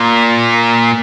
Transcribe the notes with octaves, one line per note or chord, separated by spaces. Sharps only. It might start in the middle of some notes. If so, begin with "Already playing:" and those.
Already playing: A#2